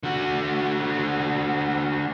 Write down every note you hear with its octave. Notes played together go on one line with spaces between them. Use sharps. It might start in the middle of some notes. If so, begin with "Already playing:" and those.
D3 F#4